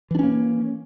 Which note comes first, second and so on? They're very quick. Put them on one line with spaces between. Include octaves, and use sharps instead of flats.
E3 D4 C#4 A#3